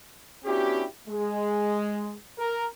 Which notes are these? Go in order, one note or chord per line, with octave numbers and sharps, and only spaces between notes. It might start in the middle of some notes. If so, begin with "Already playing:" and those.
B3 C#4 D4 E4 F#4 G4
G#3
A#4